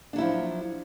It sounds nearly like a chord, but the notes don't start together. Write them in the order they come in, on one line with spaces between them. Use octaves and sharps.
D4 F#3 E4 F3